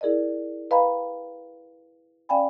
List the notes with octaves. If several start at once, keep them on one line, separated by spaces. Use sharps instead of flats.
E4 G#4 A#4 D5 D#5
B4 D#5 F5 G5 A#5 B5
C#4 D5 F5 G5 G#5 B5